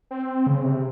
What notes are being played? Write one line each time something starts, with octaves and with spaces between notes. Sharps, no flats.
C4
C#3
C3